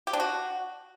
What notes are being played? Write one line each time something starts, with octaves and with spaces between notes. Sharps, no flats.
G4
D4
F#4